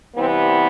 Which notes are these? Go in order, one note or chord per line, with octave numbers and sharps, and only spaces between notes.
C3 E3 G3 B3 C4